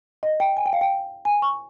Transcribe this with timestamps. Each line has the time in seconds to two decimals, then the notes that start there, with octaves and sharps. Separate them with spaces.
0.23 D#5
0.40 G5
0.57 G#5
0.66 G5
0.73 F5
0.81 G5
1.25 G#5
1.42 C#6